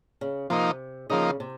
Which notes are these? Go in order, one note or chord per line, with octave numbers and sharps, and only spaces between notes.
C#3
C3 F3 A#3 D#4
C#3 F3 A#3 D#4
C3